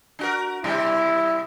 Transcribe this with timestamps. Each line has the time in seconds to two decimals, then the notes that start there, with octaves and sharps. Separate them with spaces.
0.19 D4 F#4 A#4
0.64 B2 G3 E4